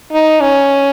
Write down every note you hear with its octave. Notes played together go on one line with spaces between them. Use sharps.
D#4
C#4